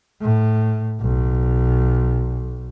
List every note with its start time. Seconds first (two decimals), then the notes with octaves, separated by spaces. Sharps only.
0.21 A2
1.01 B1